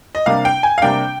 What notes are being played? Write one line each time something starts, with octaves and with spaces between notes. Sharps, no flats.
D#5
C3 G3 A#3 D4 F5
G5
G#5
F5
C3 G3 A#3 D4 G5